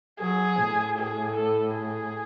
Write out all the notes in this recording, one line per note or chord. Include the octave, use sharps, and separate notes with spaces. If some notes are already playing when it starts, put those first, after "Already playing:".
F#3 G#4
A2
G#4
A4
G#4